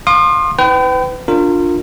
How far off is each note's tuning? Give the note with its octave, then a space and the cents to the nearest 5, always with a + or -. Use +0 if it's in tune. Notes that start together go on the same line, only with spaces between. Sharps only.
F5 +15 C6 +25 D#6 -40
E4 -45 B4 +35 G5 -25
D4 +0 F4 +10 A#4 -25